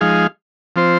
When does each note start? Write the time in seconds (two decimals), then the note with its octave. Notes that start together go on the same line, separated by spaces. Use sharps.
0.01 F3 G#3 D#4 G#4 F5
0.76 F3 C4 F4 C5